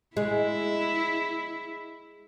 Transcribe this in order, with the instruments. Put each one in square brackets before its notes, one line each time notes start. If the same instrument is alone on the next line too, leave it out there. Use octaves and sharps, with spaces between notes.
[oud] G#3 [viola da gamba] E4